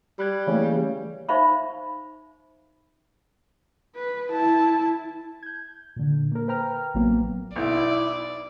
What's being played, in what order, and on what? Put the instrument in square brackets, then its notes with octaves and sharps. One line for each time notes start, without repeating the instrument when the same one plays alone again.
[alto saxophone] G3 [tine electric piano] B5 F#6 G#6
[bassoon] C#3 [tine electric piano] E3 A3 A#3
[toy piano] D#4 C5 E5 F5 B5 C#6
[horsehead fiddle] B4
E4 A5
[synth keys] G6 G#6
A#2 D3
A#3 A#4
B4 C5 G5 A#5 F6
A1 F#3 A#3 B3
[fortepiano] B1 [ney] E4 [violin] D5